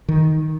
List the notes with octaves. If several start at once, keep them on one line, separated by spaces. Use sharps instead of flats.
D#3